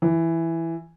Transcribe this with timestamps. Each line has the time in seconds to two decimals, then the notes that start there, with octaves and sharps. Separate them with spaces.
0.02 E3